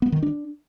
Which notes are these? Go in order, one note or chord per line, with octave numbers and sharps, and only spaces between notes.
B3
D#3
D4